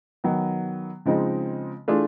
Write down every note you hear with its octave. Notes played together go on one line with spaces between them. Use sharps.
D#3 F#3 B3
C#3 F3 G#3 C4 D#4
E3 A3 D4 F4 G#4